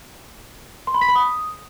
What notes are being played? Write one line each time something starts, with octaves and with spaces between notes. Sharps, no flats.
C6
B5
B6
B5
D#6